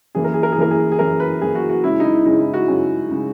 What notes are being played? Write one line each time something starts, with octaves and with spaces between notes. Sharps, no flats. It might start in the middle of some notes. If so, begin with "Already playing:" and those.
F#2 E3 A#3 G#4
A#4
G#4
A#4
G#4
F#2 E3 A#3 A#4
G#4
G#4
F#2 E3 A#3 A#4
B4
F#2 E3 A#3 G#4
F#4
F#4
F#2 C#3 G#3 E4
D#4
E4
F#2 C#3 G#3 D#4
E4
F#4
F#2 C#3 G#3
C#3 G#3